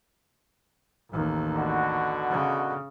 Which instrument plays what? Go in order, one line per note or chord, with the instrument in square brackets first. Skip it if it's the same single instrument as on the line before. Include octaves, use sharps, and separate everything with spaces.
[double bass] A1 D#2
[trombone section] B2 D3 F#4
[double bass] C#3